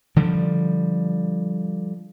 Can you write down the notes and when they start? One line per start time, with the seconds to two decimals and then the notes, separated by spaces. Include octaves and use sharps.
0.16 D3 F3 G3